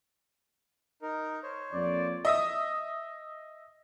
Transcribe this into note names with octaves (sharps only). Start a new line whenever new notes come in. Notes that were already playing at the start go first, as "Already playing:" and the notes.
D#4 A#4
C5 C#5
F2 A#3 D5
D#5 E5 D#6